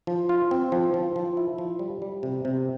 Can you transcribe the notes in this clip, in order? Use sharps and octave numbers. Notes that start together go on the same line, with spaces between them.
F3
F4
C4
F3
F3
F3
E4
F3
G3
G3
C3
C3